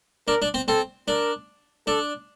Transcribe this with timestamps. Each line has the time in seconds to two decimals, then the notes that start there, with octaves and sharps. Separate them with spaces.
0.28 D4 A#4
0.42 D4
0.54 C4
0.68 C4 A4
1.08 D4 A#4
1.87 D4 A4